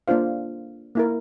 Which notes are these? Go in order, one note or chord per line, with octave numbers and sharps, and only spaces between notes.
A#3 D4 F4 C5 F5
A#3 E4 A#4